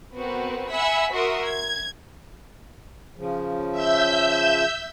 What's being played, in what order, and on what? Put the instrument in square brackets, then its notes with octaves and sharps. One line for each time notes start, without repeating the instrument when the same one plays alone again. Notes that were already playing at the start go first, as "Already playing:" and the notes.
[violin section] B3 C4 F#4 A#4 B4
E5 F#5 G#5 B5 E6 B6
F#4 A#4 E5 C6 D#6
G#6
[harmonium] C#3 F3
[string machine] E5 E6 G6